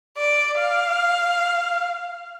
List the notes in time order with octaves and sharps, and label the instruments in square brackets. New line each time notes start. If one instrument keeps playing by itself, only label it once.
[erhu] D5
F5